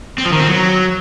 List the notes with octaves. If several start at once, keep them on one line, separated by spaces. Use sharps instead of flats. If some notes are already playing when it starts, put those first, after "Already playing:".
C4
F3
D#3
C4
F#3